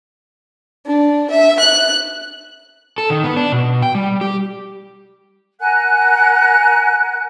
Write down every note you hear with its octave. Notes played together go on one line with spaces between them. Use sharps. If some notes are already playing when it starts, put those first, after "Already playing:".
D4
E5
F#6
A4
D#3
B3
D4
B2
G5
G3
G4
A#4 F#5 G#5 F#6